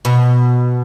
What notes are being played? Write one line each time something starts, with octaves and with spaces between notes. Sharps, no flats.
B2